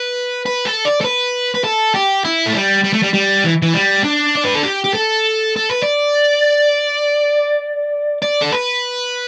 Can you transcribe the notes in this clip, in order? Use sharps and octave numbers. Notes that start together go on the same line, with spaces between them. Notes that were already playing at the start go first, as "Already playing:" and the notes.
Already playing: B4
B4
A4
D5
A4
B4
B4
A4
G4
E4
A3
G3
G3
A3
G3
G3
E3
E3
G3
D4
D5
B4
A4
G4
G4
A4
A4
B4
D5
D5
A4
B4